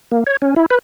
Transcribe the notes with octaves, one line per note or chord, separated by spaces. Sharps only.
A#3
C#5
C#4
E4
B4